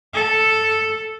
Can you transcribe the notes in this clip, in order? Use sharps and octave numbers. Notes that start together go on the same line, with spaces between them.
A4